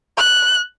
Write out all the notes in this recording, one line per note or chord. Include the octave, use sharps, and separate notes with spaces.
F#6